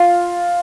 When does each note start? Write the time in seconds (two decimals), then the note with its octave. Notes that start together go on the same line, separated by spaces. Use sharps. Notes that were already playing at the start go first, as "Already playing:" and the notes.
Already playing: F4